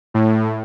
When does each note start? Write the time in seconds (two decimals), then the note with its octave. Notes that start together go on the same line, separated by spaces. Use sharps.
0.14 A2